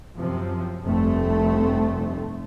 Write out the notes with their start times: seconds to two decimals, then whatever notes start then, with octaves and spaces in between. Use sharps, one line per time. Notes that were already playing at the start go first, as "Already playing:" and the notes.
0.16 F#2 C3 F3
0.85 F1 G2 A3 C4